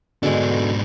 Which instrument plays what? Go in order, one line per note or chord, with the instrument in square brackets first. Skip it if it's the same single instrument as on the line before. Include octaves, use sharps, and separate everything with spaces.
[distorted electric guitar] G#2 D4 [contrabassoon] B2 [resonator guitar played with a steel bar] D3 G#3